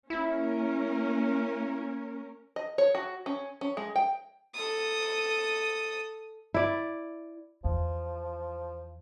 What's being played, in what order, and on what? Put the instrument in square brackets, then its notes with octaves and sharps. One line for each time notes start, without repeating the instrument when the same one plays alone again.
[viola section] A#3 C#4 A#4 [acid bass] E4
[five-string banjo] D#5
C#5
F#4
C#4
C#4
G#3
G5
[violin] A4 D#6
[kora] E4 D5
[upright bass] E2 [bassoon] F3